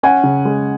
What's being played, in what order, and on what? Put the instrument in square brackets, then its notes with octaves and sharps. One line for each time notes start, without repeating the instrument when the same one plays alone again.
[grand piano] C#4 [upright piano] F#5 G#5
[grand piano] C#3
G#3